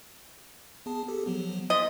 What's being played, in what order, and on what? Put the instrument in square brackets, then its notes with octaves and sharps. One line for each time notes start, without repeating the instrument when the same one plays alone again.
[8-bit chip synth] B3 G#4 A5
G4 A4
F3 F#3 B3
[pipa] D#5 [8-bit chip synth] C6 A6 B6